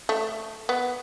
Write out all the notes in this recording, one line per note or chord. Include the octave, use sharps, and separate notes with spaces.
A3
B3